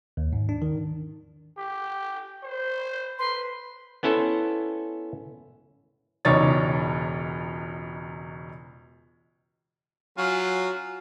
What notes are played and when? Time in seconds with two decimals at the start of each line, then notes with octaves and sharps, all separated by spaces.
0.17 D#2
0.33 G#2
0.49 D4
0.62 D#3
1.58 G4
2.43 C5
3.19 B4 C6
4.03 B3 C#4 E4 A4 C5
6.25 E1 C#2 D#4 C#5 D5 A6
10.18 F#3 C#4 F4